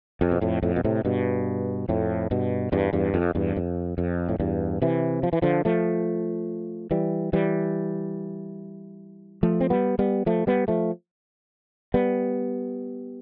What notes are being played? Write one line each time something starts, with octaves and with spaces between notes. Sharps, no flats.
F2
B2
F2 A2
F2 A2
B2
A2 C3
G2 B2
F2 A2
G2 B2
E2 G2
E2 G2
F2
E2 G2
F2
F2
A2
E2 G2
C3 E3
F3
E3
D3 F3
F3 A3
E3 G3
E3 G3
F3 A3
C4
G3 B3
G3 B3
F3 A3
G3 B3
F3 A3
G3 B3